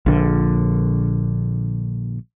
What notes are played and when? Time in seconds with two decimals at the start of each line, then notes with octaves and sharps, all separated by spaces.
0.06 A#1 D3